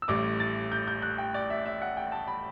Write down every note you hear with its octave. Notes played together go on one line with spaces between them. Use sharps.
E6
A1 A2 G3 D6
A6
G6
G6
F#6
G5
D5
E5
E5
F#5
G5
A5
B5